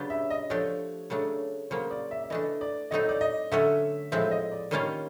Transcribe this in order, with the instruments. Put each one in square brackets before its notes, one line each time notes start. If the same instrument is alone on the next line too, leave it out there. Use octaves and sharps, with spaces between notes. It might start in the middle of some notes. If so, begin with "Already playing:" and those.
Already playing: [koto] C#3 F#3 B3 D4 G4
[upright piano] E5
D#5
[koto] F3 A3 D4 G4 [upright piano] C#5
[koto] C#3 F#3 A3 D4
[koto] C#3 F#3 A#3 [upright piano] C5
[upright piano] D5
E5
E5
[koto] E3 A3 D4 [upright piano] D#5
[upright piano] D5
[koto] A2 F#3 A3 C4 D#4 [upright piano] D#5
[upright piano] D5
D#5
[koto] D3 F#3 A3 C#4 F#4 [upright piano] E5
[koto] A2 F3 G#3 C4 [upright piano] E5
[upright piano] D#5
D5
[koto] D#3 G3 A#3 C#4 F4 [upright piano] C#5